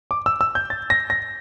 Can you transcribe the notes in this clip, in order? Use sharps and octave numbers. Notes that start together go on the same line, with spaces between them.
D6
E6
E6
G6
A6
A#6
A#6